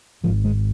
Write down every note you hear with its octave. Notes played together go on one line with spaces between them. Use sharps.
G#1 G#2 F3
G#3